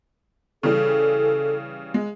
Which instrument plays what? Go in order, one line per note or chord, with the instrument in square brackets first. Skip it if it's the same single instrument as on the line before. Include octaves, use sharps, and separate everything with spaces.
[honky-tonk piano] C#3 E3 G3 [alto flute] A4
[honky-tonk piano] G#3